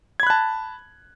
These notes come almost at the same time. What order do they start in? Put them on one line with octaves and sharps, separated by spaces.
G#6 B5 F#6 A5